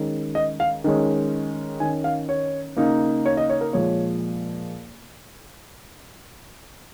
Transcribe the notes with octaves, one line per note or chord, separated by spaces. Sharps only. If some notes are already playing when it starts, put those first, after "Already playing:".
Already playing: D#3 G#3 C#4
D#5
F5
D#3 G#3 C#4
D#3 C#4 G#5
F5
C#5
C#3 A#3 D#4
C#5
D#5
C#5
A#4
A#2 F3 G#3 C#5